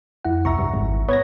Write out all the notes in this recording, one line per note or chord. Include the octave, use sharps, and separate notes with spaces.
F2 E4 F#5
C2 E5 A#5 C#6
G2
G#1
B3 C#5 G#6 A#6